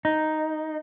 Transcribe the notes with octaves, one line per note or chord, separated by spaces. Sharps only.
D#4